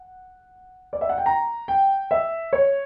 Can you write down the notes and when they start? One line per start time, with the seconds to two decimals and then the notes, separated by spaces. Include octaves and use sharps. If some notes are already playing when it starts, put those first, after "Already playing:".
Already playing: F#5
0.93 D5
1.01 E5
1.09 F#5
1.18 G5
1.26 A#5
1.68 G5
2.11 E5
2.53 C#5